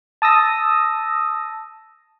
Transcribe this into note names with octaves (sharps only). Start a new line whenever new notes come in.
A5 D#6 E6 A#6